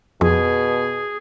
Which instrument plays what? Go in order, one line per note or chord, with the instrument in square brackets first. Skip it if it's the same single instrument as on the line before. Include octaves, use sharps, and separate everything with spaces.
[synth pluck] F2 [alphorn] B2 [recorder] G#4